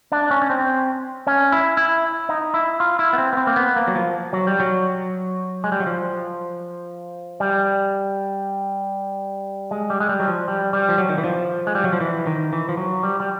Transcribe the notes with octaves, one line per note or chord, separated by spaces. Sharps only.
D4
C#4
C#4
C4
C#4
E4
E4
D#4
E4
F4
E4
B3
C4
B3
C4
A#3
B3
A#3
F#3
F3
F#3
G3
F#3
G#3
G3
F#3
F3
G3
G#3
G3
G#3
G3
F#3
F3
G3
G3
F3
F#3
D#3
E3
F3
G#3
G3
F#3
F3
E3
D#3
E3
F3
F#3
G3
G3